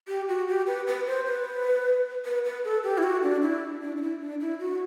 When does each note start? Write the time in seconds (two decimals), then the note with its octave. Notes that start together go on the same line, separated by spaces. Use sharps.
0.08 G4
0.28 F#4
0.48 G4
0.67 B4
0.87 B4
1.07 C5
1.27 B4
2.25 B4
2.45 B4
2.65 A4
2.84 G4
2.98 E4
3.03 F#4
3.23 D4
3.42 E4
3.82 D4
3.97 D4
4.02 E4
4.21 D4
4.41 E4
4.60 F#4